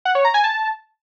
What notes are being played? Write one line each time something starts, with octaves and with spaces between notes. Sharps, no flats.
F#5
C#5
A#5
G#5
A5